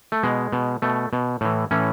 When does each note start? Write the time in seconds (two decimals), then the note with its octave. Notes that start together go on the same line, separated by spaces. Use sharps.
0.12 A3
0.23 B2 G#3
0.53 B2
0.82 B2 A3
1.13 B2
1.41 A2 E3
1.71 A2 E3 C#4